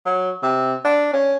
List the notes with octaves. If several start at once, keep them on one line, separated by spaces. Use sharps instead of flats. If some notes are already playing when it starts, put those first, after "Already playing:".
F#3
C3
D4
C#4